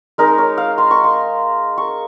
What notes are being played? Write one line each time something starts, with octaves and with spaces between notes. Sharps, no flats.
G#3 D#4 A#4
C#5
F5
C6
C#6
C6
C#6